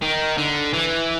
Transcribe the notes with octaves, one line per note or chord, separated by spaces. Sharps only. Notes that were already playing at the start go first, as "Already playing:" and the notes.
D#3
D3
E3